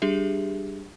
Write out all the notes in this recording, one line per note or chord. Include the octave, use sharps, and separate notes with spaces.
G3 D4 G4 G#4 E5